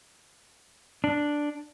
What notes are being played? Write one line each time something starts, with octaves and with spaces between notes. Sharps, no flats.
D4